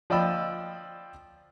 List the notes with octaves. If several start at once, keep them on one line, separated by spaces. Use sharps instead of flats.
F3 D5 D#5 G5 B5 E6